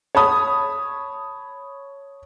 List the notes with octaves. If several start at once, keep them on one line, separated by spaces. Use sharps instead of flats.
C#5 A5 B5 D#6